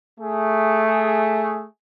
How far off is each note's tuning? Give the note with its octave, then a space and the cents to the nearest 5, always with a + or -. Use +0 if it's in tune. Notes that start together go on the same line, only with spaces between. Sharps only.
A3 +0 G#4 +0